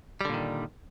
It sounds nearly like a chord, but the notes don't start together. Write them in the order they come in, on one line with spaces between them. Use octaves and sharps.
G3 D3 A#2 D#3